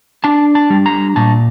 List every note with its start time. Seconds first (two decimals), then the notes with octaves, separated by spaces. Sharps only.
0.24 D4 A5
0.55 A5
0.70 G3
0.86 A#5
1.16 A#2 A5